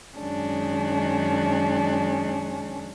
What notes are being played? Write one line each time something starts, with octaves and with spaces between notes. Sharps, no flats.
F#2 D#3 G#3 C#4 D4